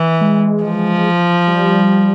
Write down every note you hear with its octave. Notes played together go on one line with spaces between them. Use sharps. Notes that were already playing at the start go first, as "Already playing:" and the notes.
Already playing: E3
G#3
F3
G3